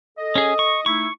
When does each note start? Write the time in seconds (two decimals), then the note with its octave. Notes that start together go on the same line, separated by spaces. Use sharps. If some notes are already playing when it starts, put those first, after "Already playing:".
0.18 A4 D#5
0.35 C#4 G#4
0.59 C#6
0.86 A3 D#4 E4 C#6